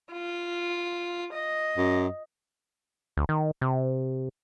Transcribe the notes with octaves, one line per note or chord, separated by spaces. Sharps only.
F4
D#5
F#2
D2
D#3
C3